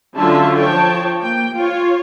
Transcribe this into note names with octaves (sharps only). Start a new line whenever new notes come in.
D3 F#3 C#4 F4 E5 A5
F3 C#5 G5 A5
A#3 G5
F4 C#5